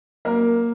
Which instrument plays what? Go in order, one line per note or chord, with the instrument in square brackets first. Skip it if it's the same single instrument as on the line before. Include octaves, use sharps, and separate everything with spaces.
[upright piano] F#3 A#3 A#4